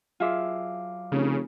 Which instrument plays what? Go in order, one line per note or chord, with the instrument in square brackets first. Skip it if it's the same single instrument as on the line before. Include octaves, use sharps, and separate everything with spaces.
[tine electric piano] F#3 F5 D6 [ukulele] F4 G#4 E5
[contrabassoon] F1 [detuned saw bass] C#3